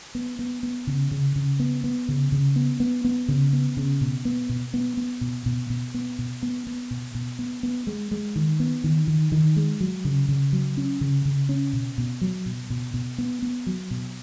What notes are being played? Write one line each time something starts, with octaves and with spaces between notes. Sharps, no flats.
B3
B3
B3
C#3
C#3
C#3
B3
B3
C#3
C#3
B3
B3
B3
C#3
B3
C#3
B2
B3
B2
B3
B3
B2
B2
B2
B3
B2
B3
B3
B2
B2
B3
B3
G#3
G#3
D#3
B3
D#3
D#3
D#3
G#3
F#3
C#3
C#3
F#3
C#4
C#3
C#3
C#4
B2
B2
F#3
B2
B2
B2
B3
B3
F#3
B2